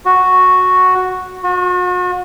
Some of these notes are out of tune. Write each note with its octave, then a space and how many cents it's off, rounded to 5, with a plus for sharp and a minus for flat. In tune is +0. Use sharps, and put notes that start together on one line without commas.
F#4 -5
F#4 -40